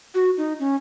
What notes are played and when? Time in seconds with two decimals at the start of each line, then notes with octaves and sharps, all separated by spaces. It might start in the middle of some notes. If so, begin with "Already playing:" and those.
0.15 F#4
0.37 D#4
0.60 C#4